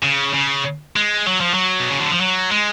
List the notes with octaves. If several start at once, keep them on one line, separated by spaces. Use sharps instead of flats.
C#3
C#3
G#3
F#3
F3
F#3
B2
C#3
D3
F3
F#3
G#3